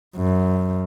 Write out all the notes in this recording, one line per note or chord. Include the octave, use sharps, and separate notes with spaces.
F#2